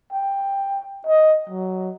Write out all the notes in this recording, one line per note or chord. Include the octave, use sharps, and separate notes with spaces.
G5
D#5
F#3